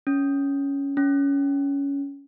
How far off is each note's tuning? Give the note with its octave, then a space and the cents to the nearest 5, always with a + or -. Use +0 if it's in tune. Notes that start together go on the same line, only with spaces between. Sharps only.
C#4 +10
C#4 +15